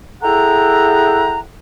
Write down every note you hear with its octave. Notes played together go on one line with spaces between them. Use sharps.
E4 G#4 A4 F#5 G5 A#5